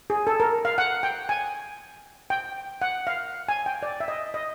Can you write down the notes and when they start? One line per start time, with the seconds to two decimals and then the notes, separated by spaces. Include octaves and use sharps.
0.10 G#4
0.27 A4
0.40 A#4
0.65 F5
0.78 F#5
1.03 G5
1.29 G#5
2.30 G5
2.82 F#5
3.07 F5
3.49 G#5
3.66 G5
3.83 D5
4.00 E5
4.08 D#5
4.34 D#5